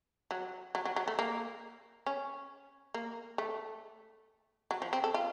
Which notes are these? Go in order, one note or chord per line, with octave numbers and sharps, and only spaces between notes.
F#3
F#3
F#3
F#3
A3
A#3
C#4
A#3
A3
F#3
F3
C4
A4
F4